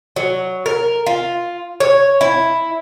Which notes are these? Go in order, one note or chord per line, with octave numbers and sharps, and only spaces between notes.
F#3
A#4
F4
C#5
E4